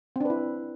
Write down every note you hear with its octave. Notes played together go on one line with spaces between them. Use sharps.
C4 D4 E4 B4